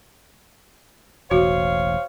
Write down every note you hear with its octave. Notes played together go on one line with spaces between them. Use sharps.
E1 A1 F#4 C5 C#5 F5